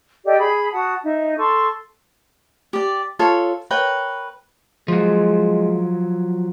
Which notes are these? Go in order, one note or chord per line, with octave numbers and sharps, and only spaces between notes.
G4 A4 D5 D#5
G#4 B5
F#4 F#5 A5 D#6
D#4 E5
A4 C6 C#6
G4 D5
F4 A4 C#5
A#4 B4 C#5 G5
F3 F#3 G#3